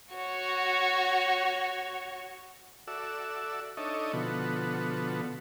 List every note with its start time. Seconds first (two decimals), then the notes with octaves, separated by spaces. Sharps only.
0.14 F#4 C#5
2.87 F#4 A4 D5 E5 E6
3.77 D4 D#4 A4 C#5 D#5 E5
4.13 B2 D3 F3 B3 F#4 A4